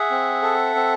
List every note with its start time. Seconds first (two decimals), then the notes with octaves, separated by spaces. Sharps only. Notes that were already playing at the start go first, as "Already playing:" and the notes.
Already playing: G#4 E5 F#5
0.11 C4
0.42 A4
0.75 C4